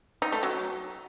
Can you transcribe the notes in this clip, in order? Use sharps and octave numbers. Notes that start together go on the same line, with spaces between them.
D#4
A3
F#3